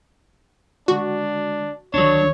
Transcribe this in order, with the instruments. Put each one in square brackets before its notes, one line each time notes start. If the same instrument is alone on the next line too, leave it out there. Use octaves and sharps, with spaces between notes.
[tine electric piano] D3 G#3 [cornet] D4 [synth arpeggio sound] F#4
[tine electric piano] C#2 D3 D#3 [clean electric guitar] F#3 D4 [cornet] C#5